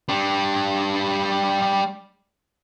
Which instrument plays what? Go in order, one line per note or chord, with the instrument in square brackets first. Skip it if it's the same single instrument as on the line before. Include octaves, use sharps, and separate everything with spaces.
[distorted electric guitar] G3 D4